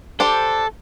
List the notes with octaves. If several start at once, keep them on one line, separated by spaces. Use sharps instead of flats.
D4 G4 A4 C5